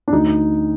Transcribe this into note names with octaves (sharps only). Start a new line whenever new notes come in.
D4
D2 D#4